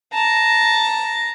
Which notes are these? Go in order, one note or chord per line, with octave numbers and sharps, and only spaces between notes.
A5 A#5